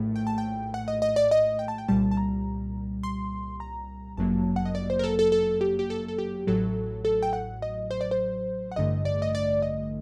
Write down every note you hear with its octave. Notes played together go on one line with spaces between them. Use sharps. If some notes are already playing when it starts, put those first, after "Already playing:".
Already playing: A#1 A2 A3
G5
A5
G5
F#5
D#5
D#5
D5
D#5
G5
A5
G5
C2 A#2 G3 A5
A5
A#5
C6
A#5
G1 F#2 F#3 A#3 A5
F#5
D#5
D5
C5
A#4
A4
A4
A4
G4
G4
A4
A4
G4
A1 A2 F#3 A4
A4
G5
F#5
D#5
C5
D5
C5
F#5
A1 G2 D3 A3 D#5
D5
D#5
D5
D#5